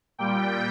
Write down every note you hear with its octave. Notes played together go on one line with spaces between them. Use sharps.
A#2 G3 G5